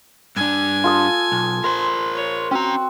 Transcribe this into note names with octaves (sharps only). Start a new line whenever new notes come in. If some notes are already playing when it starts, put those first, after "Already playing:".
G2 D4 G#5
F4 A4 D#6
B1
A#4 C5 C6
C#5
C4 C#4 F#4 A#5